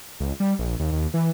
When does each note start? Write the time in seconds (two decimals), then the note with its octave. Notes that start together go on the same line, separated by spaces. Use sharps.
0.20 C#2
0.40 G3
0.59 A#1
0.80 D#2
0.92 D#2
1.14 E3